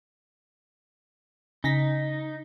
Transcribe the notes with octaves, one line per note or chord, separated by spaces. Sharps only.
C#3 D#4 A#6 B6